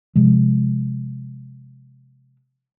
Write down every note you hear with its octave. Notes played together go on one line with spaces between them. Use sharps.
C3 F3 G#3